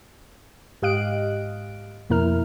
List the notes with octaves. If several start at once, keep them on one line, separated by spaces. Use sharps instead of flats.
G#2 G4 D#5 F5 F#6 D7
F2 B2 A#3 E4 A#4 F6